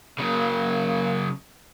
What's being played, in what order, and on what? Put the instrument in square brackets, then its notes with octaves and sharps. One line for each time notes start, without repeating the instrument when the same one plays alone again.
[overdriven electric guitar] C#3 F#3 [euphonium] A#3